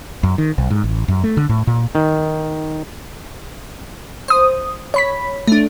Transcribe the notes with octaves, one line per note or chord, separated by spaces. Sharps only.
F#2
D#3
B1
G#2
A1
F#2
A3
D3
A2
A#2
D#3
C5 D#6
C#5 B5 B6
A3 D4